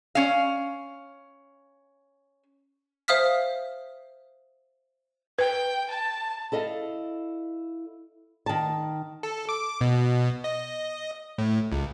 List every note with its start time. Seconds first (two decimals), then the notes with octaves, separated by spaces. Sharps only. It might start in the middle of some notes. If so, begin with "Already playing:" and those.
0.15 C#4 F5
3.08 C5 E5 F5 D#6 F6 B6
5.39 B4 G5
5.91 A5
6.52 E4 A4 D#5 F5
8.46 D#3 A5
9.23 A4
9.49 D6
9.81 B2
10.44 D#5
11.38 A2
11.72 C#2